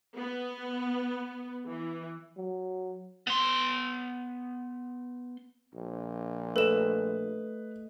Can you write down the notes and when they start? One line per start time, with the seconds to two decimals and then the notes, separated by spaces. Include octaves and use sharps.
0.18 B3
1.68 E3
2.37 F#3
3.27 B3 C6
5.75 A#1
6.56 A3 A4 B4 D#5 E7